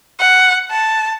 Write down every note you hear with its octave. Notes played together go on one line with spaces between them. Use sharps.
F#5
A5